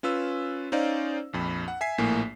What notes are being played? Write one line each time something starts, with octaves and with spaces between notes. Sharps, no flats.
C#4 F4 B4 E6
C#4 D#4 C5 D5 F5
A#1 F2 B5
F#5
E5 G#5 B6 C7
A#1 A2 A#3 G#5